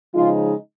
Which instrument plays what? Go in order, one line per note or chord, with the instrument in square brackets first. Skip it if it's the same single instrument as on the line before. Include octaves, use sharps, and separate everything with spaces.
[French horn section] C#3 F3 G#3 D#4 F4